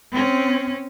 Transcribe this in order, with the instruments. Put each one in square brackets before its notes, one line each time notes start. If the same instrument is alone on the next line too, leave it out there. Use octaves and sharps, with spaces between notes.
[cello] C4 C#4